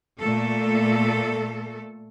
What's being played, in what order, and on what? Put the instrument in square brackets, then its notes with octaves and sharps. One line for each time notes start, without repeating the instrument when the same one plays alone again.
[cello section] A#2 A3 A4